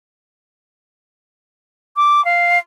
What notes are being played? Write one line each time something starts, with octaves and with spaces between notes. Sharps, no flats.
D6
F5